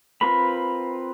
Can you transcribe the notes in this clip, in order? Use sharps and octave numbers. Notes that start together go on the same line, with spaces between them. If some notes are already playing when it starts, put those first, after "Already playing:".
C4 F4 A#4 B4 B5